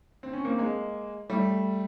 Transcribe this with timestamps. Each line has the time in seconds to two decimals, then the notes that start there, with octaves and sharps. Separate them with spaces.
0.23 C4
0.33 C#4
0.45 A#3 C4
0.58 G#3 A#3
1.30 G3 A3